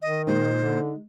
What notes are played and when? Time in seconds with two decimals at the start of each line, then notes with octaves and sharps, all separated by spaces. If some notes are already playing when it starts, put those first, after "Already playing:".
0.02 D#3 D#5
0.27 A#2 G#3 D#4 C5
0.57 D3